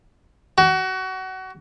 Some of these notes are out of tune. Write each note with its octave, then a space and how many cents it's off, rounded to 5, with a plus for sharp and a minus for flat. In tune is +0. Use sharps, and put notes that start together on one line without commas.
F#4 +25